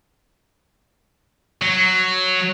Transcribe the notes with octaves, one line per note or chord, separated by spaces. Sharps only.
F#3